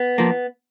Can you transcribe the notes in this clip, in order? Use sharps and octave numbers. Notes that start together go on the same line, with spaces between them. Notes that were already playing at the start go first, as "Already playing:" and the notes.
Already playing: B3
F3 A#3